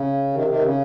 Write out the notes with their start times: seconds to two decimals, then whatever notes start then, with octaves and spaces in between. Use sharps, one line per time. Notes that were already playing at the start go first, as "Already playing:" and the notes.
Already playing: C#3
0.33 C3 D#3
0.47 C3 D#3
0.62 C#3